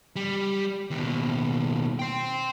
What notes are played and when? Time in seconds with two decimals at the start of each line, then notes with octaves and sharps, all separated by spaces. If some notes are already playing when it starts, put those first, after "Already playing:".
0.16 G3
0.91 D#2 B2
1.99 G5 C6